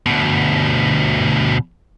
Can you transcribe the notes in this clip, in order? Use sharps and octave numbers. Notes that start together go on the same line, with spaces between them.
D2 B2